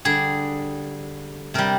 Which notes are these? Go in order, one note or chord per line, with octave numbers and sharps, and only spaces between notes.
D3 G3 G#4
C3 G3 A#4